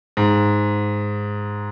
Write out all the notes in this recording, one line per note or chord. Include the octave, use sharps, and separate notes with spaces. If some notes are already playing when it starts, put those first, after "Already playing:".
G#2